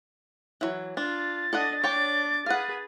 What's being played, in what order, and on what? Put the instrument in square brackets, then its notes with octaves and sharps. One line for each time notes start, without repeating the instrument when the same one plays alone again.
[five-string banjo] E3 F#3
[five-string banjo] D4 [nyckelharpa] F4 [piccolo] A6
[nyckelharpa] D4 D#5 [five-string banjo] A4 D5 F#5
[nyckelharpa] D4 D6 [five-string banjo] C#5 G5 A5
[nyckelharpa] G#4 B4 [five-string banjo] F5 F#5